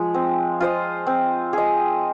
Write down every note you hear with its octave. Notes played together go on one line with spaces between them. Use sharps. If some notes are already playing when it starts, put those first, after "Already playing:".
Already playing: F3 G#3
C4
F4 C5 D#5
C4
G#4 D#5